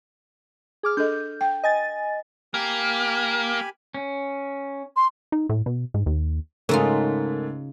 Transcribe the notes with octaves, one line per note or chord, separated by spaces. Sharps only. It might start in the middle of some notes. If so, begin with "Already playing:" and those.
G#4 D6 F6
D4 A4 D#5 G6
G5
D#5 G#5 A6
A#3 G4 G#5 B5
C#4
C6
D#4
A2
B2
G#2
D#2
G#2 C#3 A3 D#4 F4 A#4